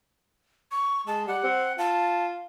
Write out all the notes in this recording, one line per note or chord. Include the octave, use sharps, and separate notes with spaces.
C#6
G#3 A5
G3 F#5
C4
F4 A5